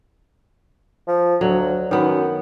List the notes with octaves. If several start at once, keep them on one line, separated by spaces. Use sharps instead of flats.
F3
D2 F#3
F#2 D#3 B3